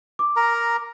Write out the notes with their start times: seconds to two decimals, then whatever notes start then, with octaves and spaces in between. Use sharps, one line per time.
0.19 D6
0.36 A#4 A#5